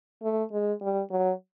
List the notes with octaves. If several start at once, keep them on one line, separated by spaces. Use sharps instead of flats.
A3
G#3
G3
F#3